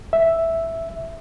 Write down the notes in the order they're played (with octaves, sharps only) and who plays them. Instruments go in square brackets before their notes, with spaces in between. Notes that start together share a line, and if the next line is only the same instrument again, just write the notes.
[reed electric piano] E5